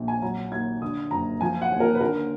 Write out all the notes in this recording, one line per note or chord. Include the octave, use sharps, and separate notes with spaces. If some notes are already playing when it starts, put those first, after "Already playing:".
Already playing: A#1
G#5
F#3 A#5
D#2 G#6
D3 D#6
F#1 A#5
F3 G#5
F#5
D#2
A#4
B4
D3 A#4